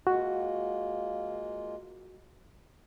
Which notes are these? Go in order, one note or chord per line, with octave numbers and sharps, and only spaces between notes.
G#3 A#3 F4 F#4